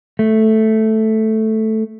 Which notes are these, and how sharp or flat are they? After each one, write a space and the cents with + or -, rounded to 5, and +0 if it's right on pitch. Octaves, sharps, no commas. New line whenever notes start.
A3 +0